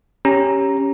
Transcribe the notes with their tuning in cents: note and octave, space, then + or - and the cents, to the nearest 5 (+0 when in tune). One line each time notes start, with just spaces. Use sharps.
C#4 +0 G4 +0 A#5 +0